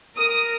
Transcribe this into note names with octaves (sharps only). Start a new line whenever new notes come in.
A#4 D#6